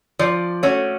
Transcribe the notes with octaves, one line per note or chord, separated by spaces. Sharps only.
F3 D5
A3 C#4 F#4 C#5